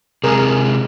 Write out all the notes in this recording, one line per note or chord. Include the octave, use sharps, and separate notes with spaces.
C3 G#3 G#4 A#4